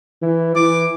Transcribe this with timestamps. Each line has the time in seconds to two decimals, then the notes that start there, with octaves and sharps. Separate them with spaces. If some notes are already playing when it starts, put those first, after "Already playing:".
0.22 E3
0.56 E3 D6